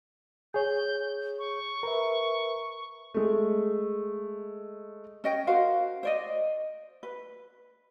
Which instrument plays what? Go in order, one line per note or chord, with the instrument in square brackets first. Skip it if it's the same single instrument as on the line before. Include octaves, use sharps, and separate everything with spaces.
[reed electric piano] G#4 C#5 [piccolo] G6
[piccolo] C#6
[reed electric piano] A#4 B4 E5
[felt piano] G#3 A3
[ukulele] C#4 D#5 G5
F#4 A#4 C5 F5
C5 D5 D#5
B4